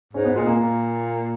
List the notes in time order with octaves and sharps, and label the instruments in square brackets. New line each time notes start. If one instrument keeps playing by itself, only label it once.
[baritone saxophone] G#2 [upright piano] C#4
[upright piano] B3
[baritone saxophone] A#2 [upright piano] G#3
[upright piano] A#3
[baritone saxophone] A#2